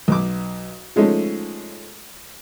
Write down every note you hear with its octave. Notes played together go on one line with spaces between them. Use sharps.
B1 D6
F3 G#3 A3 C#4 D#4